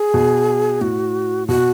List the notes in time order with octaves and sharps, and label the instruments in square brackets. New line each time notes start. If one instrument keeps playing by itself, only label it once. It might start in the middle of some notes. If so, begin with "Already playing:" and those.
Already playing: [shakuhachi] G#4
[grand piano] B2
[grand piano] A2 [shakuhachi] F#4
[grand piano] B2 [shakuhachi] F#4